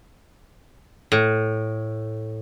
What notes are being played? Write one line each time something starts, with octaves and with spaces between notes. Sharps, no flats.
A2